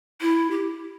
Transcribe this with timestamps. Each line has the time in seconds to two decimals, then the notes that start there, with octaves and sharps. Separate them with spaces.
0.21 E4
0.51 G4